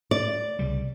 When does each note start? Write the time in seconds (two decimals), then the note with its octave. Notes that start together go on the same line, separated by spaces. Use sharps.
0.11 D5
0.59 C2 C#3 G3